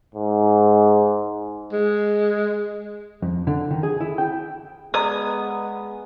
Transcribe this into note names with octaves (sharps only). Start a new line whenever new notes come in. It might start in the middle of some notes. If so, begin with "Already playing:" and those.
G#2
G#3
F2
D3
D#3
G#4
E4
G5
G#3 B3 D5 D#5 A#5 D#6